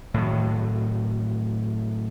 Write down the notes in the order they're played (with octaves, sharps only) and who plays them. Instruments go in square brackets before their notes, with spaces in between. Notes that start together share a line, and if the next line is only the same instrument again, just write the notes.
[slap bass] A2 D#3 F#3